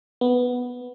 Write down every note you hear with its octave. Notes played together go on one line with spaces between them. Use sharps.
B3